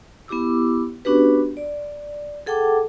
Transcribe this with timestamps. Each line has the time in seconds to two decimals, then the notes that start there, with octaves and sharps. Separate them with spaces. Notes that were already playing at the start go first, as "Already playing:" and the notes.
0.28 B3 E4 G4 D6 E6
1.05 B3 C#4 D4 F#4 G4 B4
1.57 D5
2.46 G#4 A4 F#5 G5 A5 D6